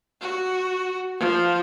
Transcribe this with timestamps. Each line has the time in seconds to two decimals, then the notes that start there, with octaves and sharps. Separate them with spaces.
0.21 F#4
1.19 F3